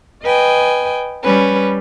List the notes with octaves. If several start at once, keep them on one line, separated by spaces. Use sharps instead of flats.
B4 D#5 G5 G#5
G3 C#4 B4